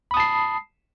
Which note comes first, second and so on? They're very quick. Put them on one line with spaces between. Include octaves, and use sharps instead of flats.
B5 D#6 A5 C7